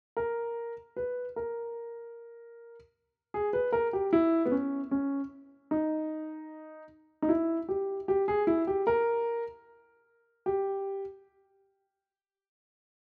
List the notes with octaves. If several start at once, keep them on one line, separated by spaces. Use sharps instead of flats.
A#4
B4
A#4
G#4
B4
A#4
G4
E4
B3
C#4
C#4
D#4
D#4
E4
G4
G4
G#4
E4
G4
A#4
G4